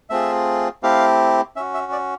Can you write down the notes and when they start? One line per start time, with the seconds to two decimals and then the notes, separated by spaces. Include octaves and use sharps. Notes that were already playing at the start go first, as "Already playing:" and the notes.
0.10 A3 C4 F4 G#4 E5
0.83 A3 C4 E4 G4 F5
1.56 C#4 F#4 E5
1.74 E5
1.92 D5